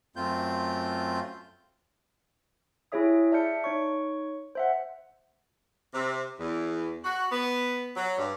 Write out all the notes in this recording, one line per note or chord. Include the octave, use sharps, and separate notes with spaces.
F#2 A3 C4 F4 G6
E4 G4 G#4 C#5 E5 D#6
D5 E5 A5 F6 G6 C#7
D#4 C#5 C#6
C5 E5 F#5
C3
E2
F#4
B3
F#3
G2